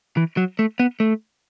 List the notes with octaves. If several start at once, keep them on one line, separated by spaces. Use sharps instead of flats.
E3
F#3
A3
B3
A3